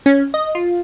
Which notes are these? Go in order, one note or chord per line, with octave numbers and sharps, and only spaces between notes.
C#4
D#5
F4